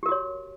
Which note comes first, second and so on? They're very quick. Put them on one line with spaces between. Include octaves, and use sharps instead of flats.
G4 A#4 F#4 C#5